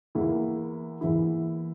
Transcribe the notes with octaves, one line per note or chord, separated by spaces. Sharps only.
E2 E3 A#3 E4
E2 E3 A#3 E4